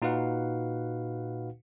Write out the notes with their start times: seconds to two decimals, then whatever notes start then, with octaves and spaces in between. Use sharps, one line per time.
0.02 A#2 D#4 F#4 B4 F5 F#5